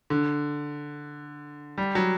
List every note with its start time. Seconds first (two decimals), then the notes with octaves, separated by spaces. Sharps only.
0.10 D3
1.78 G3
1.95 F#3